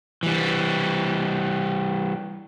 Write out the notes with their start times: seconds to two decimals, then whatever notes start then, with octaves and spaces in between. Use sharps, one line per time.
0.23 E3 G3